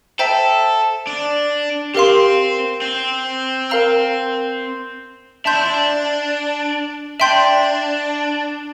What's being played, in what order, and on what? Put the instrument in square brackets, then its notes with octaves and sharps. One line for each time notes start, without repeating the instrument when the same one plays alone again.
[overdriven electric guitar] A4 [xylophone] C5 E5 G5 A#5
[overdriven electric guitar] D4
[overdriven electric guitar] C4 [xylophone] G4 A#4 F5 C6
[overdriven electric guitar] C4
[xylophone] A#4 F5 A#5 E6
[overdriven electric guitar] D4 [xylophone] E5 A5 C6 G6
[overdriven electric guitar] E4
D4
[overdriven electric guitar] D4 [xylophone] E5 G5 C6 G6